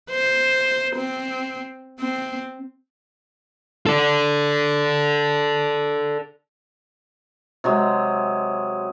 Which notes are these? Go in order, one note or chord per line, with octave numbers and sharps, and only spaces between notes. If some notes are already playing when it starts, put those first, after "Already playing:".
C5
C4
C4
A4 D5
C3 F#3 G#3